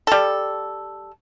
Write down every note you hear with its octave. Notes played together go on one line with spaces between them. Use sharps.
G3 A4